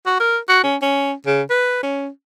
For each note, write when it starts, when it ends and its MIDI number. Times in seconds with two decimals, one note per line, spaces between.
0.06 0.15 66
0.20 0.37 70
0.49 0.64 66
0.64 0.77 61
0.82 1.13 61
1.26 1.42 49
1.50 1.80 71
1.83 2.09 61